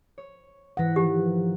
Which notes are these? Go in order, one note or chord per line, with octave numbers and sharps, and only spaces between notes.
C#5
G#2 E3 F#5 A#6 B6
D#3 F3 G4